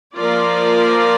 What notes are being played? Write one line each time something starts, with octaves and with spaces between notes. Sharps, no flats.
F3 A#3 F4 A#4 D5